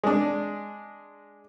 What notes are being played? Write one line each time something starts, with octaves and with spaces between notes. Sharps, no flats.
G#3 D4